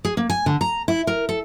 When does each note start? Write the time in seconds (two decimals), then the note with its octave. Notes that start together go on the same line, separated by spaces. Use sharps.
0.05 G#4
0.17 A#3
0.30 G#5
0.46 D3
0.61 A#5
0.88 E4
1.07 A#4
1.29 A4